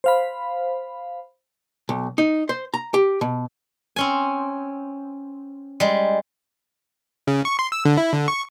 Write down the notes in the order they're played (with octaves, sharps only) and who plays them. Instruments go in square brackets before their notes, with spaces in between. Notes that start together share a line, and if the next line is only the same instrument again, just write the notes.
[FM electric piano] C5 F5 B5
[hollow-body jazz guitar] B1
D#4
C5
A#5
G4
B2
[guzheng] C4 C#4 G#5
G3 G#3
[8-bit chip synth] C#3
C#6
C6
E6
D3
E4
D3
C#6